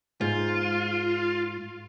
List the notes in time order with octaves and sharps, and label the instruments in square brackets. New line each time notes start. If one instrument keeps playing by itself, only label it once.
[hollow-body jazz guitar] G#2 [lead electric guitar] F4